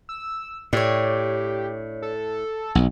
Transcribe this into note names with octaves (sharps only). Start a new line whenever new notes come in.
E6
A2 D4 G4 C#5
A4
B1